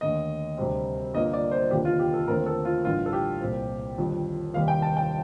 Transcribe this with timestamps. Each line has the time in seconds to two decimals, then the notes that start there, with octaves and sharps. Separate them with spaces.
0.01 D#2 D3 A3 D#5
0.57 D2 C3 G3 C4
1.14 G1 G2 F3 A#3 D#5
1.33 D5
1.51 C5
1.71 F1 D#2 D3 F3 G4
1.85 F4
1.99 G4
2.14 A4
2.27 D#2 D3 F3 A3 C4 A#4
2.46 A4
2.65 F4
2.84 A1 G2 D3 F4
3.06 A4
3.13 G4
3.41 C2 A#2 F3 C4
3.98 G1 F2 D#3 G3
4.54 F1 D#2 D#3 G3 F5
4.68 G5
4.82 A5
4.97 G5